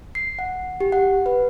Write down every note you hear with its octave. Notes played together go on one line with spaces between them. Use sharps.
C7
F#5
G4
F#5
B4